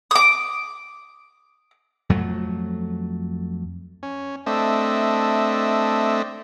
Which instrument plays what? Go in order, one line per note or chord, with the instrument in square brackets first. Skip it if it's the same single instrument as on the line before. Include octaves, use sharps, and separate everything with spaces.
[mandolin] D6 D#6
[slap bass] F2 F#3 A3
[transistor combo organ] C#4
A3 C4 D4 D#5 E5